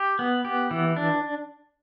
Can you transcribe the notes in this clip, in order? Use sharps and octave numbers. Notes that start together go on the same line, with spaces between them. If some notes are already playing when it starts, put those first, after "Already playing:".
Already playing: G4
B3
G4
E3
D4